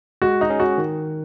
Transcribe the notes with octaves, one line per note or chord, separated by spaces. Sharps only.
G#3 F#4
D#4
C#4 G#4
F#4
D#3